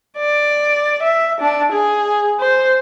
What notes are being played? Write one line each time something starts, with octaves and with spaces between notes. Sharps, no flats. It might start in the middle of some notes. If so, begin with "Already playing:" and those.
D5
E5
D4
G#4
C5